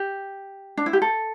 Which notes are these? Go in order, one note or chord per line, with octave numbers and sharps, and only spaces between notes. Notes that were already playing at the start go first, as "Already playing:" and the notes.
Already playing: G4
D4
E4
G4
A4